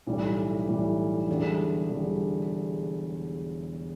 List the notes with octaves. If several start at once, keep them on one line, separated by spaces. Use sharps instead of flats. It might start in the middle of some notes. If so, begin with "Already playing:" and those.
B1 A2 E3 G3
B1 A2 E3 G3
E1 E2 D3 G3
E1 E2 D3 G3